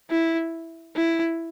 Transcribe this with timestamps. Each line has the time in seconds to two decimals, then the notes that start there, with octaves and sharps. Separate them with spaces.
0.11 E4
0.96 E4